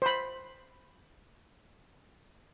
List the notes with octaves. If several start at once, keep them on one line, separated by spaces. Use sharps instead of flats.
C5 B5